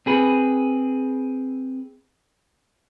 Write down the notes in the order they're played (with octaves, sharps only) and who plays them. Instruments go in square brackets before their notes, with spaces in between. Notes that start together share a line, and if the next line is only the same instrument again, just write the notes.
[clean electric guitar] C4 G#4 B4